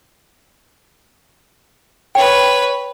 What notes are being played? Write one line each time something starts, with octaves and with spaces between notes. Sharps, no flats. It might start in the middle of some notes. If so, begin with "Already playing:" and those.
B4 C#5 G5